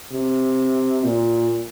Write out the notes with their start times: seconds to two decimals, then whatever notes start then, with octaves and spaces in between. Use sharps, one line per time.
0.12 C3
1.04 A#2